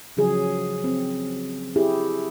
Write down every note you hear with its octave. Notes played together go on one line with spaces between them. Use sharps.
C#3 F3 F#3 G#4
C4
E4 G4 G#4